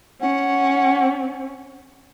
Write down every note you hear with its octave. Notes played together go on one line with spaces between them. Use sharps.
C#4 F#5